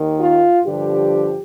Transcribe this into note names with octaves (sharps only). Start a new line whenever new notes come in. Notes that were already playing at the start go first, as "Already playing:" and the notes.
Already playing: D#2 D#3
F4
G2 D3 F3 G4